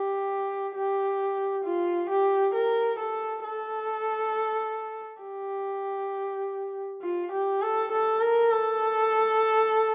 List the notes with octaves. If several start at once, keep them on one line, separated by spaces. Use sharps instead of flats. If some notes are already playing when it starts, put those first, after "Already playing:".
Already playing: G4
G4
F4
G4
A#4
A4
A4
G4
F4
G4
A4
A4
A#4
A4